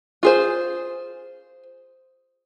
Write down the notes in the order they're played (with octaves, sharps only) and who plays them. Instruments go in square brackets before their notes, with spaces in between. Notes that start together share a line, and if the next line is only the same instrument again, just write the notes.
[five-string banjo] F4 G#4 C5